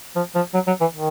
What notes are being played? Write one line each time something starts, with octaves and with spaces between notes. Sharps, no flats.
F3
F3
F#3
F#3
E3
D#3